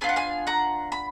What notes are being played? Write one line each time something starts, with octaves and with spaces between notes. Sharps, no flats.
B3 D4 F4 G#5
F#5
F5 G#5
F#5 A#5
B5